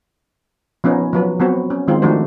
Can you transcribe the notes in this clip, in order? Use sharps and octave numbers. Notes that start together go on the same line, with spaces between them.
F3 B3 C#4 D#4
F3 F#3 B4
F#3 B3 C4 F#4
C#4
D#3 G#3 C4 F4
D#3 F3 A3 D4 F#4 C5